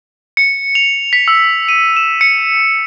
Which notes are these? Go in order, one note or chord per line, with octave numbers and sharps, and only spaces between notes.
C#7
F7
B6
E6
D#7
E7
C#7